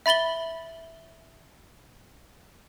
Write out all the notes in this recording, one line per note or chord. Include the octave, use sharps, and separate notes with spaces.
E5 B5 A6 F#7 G7